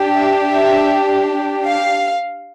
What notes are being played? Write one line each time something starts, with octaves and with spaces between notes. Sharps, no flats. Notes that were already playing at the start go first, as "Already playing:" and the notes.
Already playing: D4 G4
E5
E5
F5